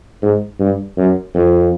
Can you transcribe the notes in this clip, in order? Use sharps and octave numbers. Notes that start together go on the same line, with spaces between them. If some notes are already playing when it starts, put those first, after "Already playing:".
G#2
G2
F#2
F2